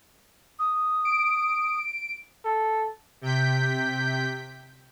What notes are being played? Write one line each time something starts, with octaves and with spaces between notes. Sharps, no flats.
D#6
D7
A4
C3 G5 G6 B6